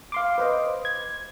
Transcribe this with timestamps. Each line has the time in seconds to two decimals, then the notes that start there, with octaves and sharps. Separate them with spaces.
0.12 F5 C6 D6
0.38 B4 C5 D#5
0.85 G#6